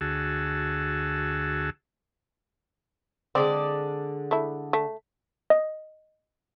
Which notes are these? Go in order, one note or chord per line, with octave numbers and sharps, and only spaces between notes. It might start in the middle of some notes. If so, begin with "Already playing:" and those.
D2 F#4 G#4 A5 E6
D3 G#3 C4 D5
A3 E4
A3
D#5